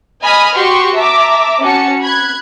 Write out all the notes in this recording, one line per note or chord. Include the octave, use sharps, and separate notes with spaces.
D#5 G#5 B5 D#6 F6
F#4 G4 C6 C#6
E5 A5 A#5 D6
C#4 F#4 A5 C#7
B5 F#6 G#6